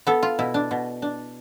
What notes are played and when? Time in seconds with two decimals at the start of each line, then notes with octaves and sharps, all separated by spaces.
0.07 B3 A4
0.23 F4
0.39 B2 E4
0.54 D4
0.71 B2
1.02 D4